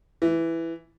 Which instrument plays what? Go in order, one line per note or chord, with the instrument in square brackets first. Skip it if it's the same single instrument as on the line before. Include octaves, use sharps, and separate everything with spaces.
[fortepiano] E3